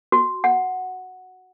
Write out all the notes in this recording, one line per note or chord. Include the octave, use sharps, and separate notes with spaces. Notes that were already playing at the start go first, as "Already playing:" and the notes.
F#4
F#5